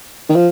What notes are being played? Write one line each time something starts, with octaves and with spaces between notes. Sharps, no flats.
D#3
F3